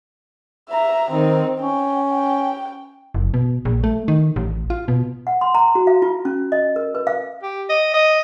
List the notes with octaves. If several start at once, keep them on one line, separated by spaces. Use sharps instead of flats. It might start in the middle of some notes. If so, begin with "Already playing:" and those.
E5 A#5
D#3 C4 D#4
C#4 G5
G5
F#1
B2
A#1
A3
D#3
A1
F4
B2
F#5
C6
A#5
F#4
F5
F4
C#4
D#5
A#4
B4
F5
G4
D#5
D#5